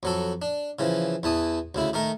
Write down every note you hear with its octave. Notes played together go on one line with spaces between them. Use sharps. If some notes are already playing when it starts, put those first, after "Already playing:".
F2 F#3 A4
D4
C#3 E3 F3
E2 E3 A5 D#6
D2 C#3 E4
D#3 A3 A#4